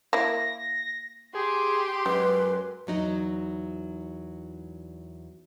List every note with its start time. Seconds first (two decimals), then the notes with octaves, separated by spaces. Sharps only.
0.13 A#3 E4 A#6
1.35 G4 G#4 C6
2.06 F#2 G#3 B4
2.87 E2 F#3 D#4